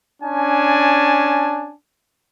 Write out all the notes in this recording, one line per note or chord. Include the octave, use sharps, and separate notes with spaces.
C#4 D4 G#5 A5